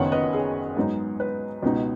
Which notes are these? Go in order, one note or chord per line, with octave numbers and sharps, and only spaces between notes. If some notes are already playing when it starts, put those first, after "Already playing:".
Already playing: F#1 F#2 D#3 B3 C#5 F#5
B4 D#5
G#4
G#2 F#3 B3 D#4
B4
C#2 B2 B3 D#4